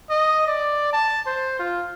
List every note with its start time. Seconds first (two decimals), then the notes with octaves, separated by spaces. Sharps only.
0.10 D#5
0.47 D5
0.93 A5
1.27 C5
1.60 F4